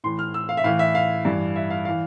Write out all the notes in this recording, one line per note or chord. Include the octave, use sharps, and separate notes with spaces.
A2 E3 C6
F6
E6
F5
E5
A2 E3 F5
E5
F5
G2 E3
E5
F5
E3 F5